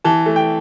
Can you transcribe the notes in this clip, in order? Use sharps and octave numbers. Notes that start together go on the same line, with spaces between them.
E3 A5
A3
G5